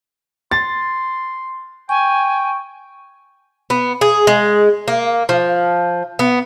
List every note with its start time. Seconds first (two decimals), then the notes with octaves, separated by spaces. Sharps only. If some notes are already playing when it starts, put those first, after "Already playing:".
0.51 C6 A6
1.89 G5 G#5 C#6
3.70 B3
4.01 G#4
4.27 G#3
4.88 A#3
5.29 F3
6.19 B3